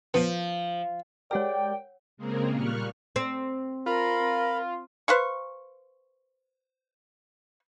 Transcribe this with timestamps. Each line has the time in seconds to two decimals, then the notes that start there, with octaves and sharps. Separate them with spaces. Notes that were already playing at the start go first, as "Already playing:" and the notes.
0.14 F3 B3
1.31 G#3 G4 A#4 C#5 D5 F#5 G5 E6
2.17 C#3 G#3 A#3 C4 G#4 A#4
2.52 A#2 G3 A#3 C#6 F6 F#6
3.16 C4
3.86 F4 A#4 B5
5.08 B4 C5 F5 C#6